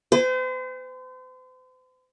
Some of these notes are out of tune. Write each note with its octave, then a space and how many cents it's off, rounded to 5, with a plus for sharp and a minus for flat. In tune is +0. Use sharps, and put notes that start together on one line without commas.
C5 -40 G#5 -45